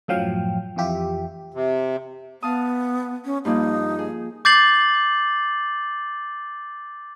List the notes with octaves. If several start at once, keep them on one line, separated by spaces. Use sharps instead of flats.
F#2 A2 F3 F#3 F5 G5
F2 E3 F4 G4 E5
C3
B3 F5 A5 D#6
C#4
G2 F3 A#3 D#4
G#4
D6 G6 A6 C7 F#7